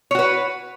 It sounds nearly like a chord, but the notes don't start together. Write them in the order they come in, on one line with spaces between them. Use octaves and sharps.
C#5 F#4 B4